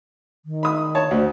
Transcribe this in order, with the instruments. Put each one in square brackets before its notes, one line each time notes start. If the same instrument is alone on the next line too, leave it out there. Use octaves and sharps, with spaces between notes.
[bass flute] D#3
[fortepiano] B5 D#6
C#5 A5
[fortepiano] D2 [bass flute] C5